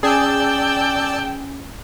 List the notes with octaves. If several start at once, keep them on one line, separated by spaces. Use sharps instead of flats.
C#4 G#4 D5 G5 A5 E6